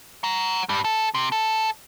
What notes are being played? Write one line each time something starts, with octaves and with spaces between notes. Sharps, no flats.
F#5 A#5
G2 G3
A4
C3
A4